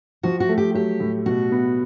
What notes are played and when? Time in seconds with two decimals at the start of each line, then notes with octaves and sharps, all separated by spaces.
0.23 F3 F#4
0.40 F#4
0.49 A3
0.58 G4
0.74 F#3 G4
1.00 A2
1.26 B2 F#4
1.52 B3